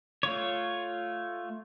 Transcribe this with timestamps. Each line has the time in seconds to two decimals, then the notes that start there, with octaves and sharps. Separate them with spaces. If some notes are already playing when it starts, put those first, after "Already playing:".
0.23 A3 F4 C#5